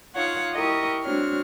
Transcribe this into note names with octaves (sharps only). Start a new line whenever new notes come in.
D#4 F4 C#5 F5 F#5
E4 G4 A#4 D#5 C#6 D#6
G#3 C4 D4 F#4 C#5 F6